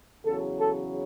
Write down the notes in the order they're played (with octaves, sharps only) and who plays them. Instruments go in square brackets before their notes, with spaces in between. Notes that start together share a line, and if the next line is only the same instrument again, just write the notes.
[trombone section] E2 C#3 F#3 A4
A4